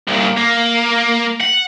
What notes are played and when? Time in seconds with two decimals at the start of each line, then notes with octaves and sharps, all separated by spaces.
0.07 C2 A#2
0.37 A#3
1.40 F#5